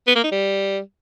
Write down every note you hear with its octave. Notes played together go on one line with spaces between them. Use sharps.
B3
A#3
D#4
G3